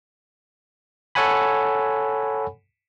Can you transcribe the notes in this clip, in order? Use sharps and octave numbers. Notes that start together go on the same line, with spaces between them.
A4 C#5 F#5 G#5 B5